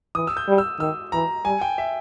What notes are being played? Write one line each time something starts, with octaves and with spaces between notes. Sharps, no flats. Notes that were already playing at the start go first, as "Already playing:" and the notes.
E3 D#6
E6
G6
G3
E6
D#3 E6
E3 A#5
G3 G#5
G5
E5